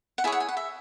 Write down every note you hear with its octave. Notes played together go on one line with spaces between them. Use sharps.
F#5
E4 G#4 C#5 G#5
F#5
G#5
F#5
E5